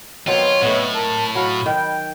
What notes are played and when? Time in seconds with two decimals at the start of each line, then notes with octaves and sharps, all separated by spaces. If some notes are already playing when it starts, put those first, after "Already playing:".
0.27 D#3 F#3 B3 C4 F4 C#5
0.61 A2 A3 B3 D#5 F#5
0.95 A#4 A5
1.35 F#3 F#4 F5 B5
1.66 D#3 G5